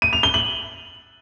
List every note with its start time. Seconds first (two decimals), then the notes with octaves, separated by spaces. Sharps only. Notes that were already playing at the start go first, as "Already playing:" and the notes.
0.02 D#7
0.13 F7
0.23 G7
0.34 F#7